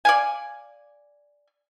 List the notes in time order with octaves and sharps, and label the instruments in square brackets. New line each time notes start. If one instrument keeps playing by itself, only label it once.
[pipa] D5 F5 G#5